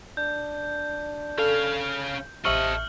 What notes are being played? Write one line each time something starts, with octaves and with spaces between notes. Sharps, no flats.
D4 G6
C#4 A4 F5
A1 C3 A4 D#5 E5 C#6 F6 F#7